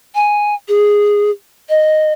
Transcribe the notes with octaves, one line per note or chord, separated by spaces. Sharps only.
G#5
G#4
D#5